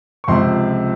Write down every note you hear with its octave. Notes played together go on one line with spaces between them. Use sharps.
C#6
C#2 C3 F3 C4 C6